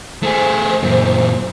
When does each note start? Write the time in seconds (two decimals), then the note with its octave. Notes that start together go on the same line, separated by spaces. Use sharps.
0.23 A3 G#4 C5
0.83 F#2 A#2